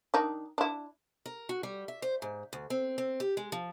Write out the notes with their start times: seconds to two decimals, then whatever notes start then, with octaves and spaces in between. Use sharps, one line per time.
0.14 D#3 D4 D#4
0.58 D4 E4
1.26 A#4
1.49 F#4
1.63 G3
1.88 E5
2.02 C5
2.22 G#2
2.53 D2
2.70 C4
2.98 C4
3.20 G4
3.37 G#3
3.52 F3